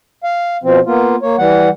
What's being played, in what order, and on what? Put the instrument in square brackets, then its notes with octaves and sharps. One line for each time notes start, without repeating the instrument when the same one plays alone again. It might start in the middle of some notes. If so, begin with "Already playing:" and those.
[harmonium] F5
B2 F3 C4
A#3 B3 F4
A#3 C#5
E3 G3 F#5